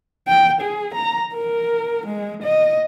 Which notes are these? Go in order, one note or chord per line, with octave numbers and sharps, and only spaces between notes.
G5
G#4
A#5
A#4
G#3
D#5